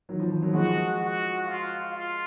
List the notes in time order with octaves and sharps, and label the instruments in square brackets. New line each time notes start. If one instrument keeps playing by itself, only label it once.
[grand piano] D#3 F#3
F3
F3
D#3 F#3
[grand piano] F3 G#3 [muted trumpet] F#4
[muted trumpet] F#4
F4
F4